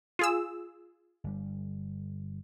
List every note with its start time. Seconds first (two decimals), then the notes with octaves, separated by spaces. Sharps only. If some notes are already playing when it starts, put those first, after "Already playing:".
0.19 F4 G#4 E6
1.24 G1 G3